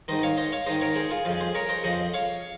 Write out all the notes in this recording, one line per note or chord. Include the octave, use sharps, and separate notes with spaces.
G#2 D#3 C5 D#5
C#5 F5
C5 D#5
C#5 F5
G#2 D#3 C5 D#5
A#4 C#5
G#4 C5
F4 G#4
F2 C#3 F4 G#4
G#4 C5
A#4 C#5
C5 D#5
F2 C#3 C5 D#5
C#5 F5